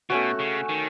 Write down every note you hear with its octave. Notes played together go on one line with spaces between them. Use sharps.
B2 A3 C#4 F#4
C#3
D#3